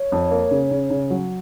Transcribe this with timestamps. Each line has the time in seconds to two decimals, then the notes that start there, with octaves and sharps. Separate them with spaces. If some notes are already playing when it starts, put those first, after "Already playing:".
Already playing: C#5
0.12 F2
0.31 A#3
0.51 C#3
0.71 C#3
0.90 C#3
1.10 F#3